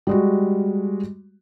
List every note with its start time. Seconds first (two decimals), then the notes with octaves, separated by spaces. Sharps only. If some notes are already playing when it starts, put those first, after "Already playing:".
0.07 G3 G#3 F#4